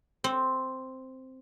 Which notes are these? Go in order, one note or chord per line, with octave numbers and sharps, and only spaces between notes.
C4